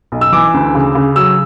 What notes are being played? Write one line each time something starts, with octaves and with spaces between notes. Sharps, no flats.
B1
E6
E3 D6
D2
C#3
C#3
F#3 E6